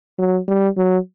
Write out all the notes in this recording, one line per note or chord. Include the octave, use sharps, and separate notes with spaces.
F#3
G3
F#3